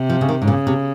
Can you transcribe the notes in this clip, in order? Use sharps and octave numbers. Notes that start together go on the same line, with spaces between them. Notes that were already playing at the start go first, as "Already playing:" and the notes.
Already playing: C3
F3
C#3
D#3
G#2
A#2 C#3
C3